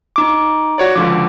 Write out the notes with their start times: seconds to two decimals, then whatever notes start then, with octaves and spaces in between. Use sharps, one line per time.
0.16 D#4 D6
0.78 F#4 C#5 D5
0.96 C#2 D3 F3 D6